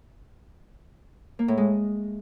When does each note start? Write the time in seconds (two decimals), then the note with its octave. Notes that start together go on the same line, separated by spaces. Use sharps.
1.39 A#3
1.48 A2
1.58 G#3